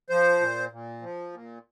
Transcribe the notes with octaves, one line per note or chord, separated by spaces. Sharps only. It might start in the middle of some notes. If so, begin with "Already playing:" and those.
F3 C5
A#2
A#2
F3
A#2